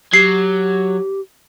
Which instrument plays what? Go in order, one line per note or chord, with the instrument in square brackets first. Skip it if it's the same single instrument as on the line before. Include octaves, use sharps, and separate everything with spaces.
[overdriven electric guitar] F#3 [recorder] G4 [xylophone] C7